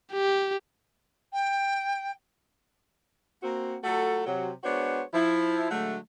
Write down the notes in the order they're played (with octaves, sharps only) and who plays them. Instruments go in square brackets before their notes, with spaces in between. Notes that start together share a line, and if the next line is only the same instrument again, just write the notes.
[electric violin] G4
[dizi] G5
[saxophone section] A#3 C4 F#4
F#3 A3 F4 F#4 A4
C3 F#3
G#3 B3 D4 F#4 C5 C#5
F3 E4
D3 F#3 G#3 A3